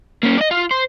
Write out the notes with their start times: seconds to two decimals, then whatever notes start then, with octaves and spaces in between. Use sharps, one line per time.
0.23 A#3 C#4
0.38 D5 D#5
0.51 F4
0.71 C5